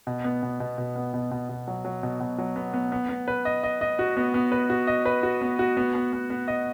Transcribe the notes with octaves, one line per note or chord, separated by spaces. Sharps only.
B2
B3
B2
B2
B2
B3
B2
B2
B2
F#3
F#3
B2
B2
F#3
B3
B3
B3
B3
B4
D#5
D#5
D#5
F#4
B3
B3
B4
F#4
D#5
B4
F#4
B3
F#4
B3
B3
B3
B3
D#5